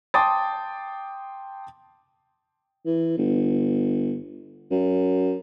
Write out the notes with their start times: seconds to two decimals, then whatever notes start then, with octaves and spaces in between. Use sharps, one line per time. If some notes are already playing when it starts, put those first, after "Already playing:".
0.14 G5 A5 C6 D6 D#6 A6
2.86 E3
3.18 G1
4.71 F#2